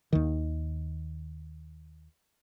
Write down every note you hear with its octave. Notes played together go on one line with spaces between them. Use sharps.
D#2 D#3